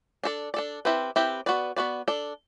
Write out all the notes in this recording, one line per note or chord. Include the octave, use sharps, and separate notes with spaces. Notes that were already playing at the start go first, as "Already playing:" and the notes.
D4 A4 D5
D4 A4 D5
C4 E4 G4 B4
C4 E4 G4 B4
B3 F#4 B4 D5
B3 F#4 B4 D5
D4 A4 D5